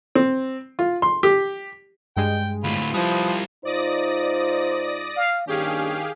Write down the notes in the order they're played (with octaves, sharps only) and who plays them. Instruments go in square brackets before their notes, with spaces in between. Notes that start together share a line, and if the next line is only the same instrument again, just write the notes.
[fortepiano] C4
F4
C6
G4
[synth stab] G2 G#3 [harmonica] G5
[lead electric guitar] D2 A2 [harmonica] F4 B5
[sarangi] F3 [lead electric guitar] G3 E4 [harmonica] B4 [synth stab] D#6
[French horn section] G#2 D#4 F4 [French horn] C5 [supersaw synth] D5 D#6 A#6
[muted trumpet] F5
[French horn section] G2 A#3 D4 [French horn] D#3 [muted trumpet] C#4 [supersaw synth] G4 G#4 F5